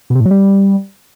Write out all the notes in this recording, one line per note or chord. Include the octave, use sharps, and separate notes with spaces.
B2
C3
A2
F#3
G3